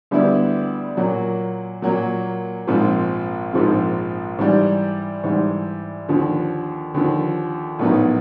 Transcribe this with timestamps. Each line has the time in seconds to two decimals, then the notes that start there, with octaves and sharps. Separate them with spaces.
0.11 D2 D3 G3 B3 E4
0.97 A#2 F#3 A#3
1.82 A#2 F#3 A#3
2.67 A#1 G#2 F3 G#3 C4
3.53 A#1 G#2 F3 G#3 C4
4.38 G#2 E3 G3
5.23 G#2 E3 G3
6.09 D#2 D3 F3
6.94 D#2 D3 F3
7.79 A#1 A2 F#3 B3 D#4